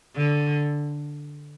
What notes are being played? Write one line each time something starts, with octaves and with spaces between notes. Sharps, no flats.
D3